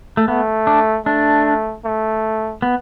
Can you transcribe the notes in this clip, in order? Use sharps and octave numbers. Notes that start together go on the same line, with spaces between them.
A3
A3 B3
D4
A3 D4
A3
B3